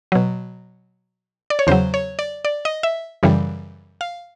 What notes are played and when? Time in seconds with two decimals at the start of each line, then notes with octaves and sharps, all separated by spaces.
0.12 B2 F#3
1.50 D5
1.59 C#5
1.67 E2 C#3 F#3 C5
1.94 C#5
2.19 D5
2.45 D5
2.65 D#5
2.83 E5
3.23 F#2 C#3 E3 G3
4.01 F5